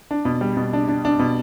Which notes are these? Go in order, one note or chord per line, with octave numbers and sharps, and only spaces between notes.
D4
B2
G3
B2
D4
D4
D4
B2